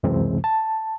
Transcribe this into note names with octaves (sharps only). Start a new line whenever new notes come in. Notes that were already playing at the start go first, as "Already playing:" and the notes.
C#2 F#2 C3 E3 G#3 C4
A5